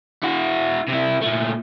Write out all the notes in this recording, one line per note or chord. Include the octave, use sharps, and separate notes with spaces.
E4 F#4
C3 E4
A#2 A3